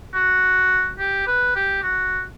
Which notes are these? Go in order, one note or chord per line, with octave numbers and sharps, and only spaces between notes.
F#4
G4
B4
G4
F#4